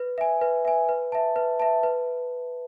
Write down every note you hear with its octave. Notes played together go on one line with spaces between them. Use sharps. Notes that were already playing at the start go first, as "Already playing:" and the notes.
Already playing: B4
E5 G#5
B4
E5 G#5
B4
E5 A5
B4
E5 A5
B4